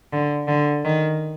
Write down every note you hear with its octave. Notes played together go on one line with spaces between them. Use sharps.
D3
D3
D#3